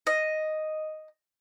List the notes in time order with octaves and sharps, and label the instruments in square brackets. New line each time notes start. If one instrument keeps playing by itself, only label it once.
[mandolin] D#5